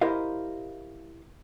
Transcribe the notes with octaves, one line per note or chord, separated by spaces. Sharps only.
E4 G4 A#4 C5 D#5 F5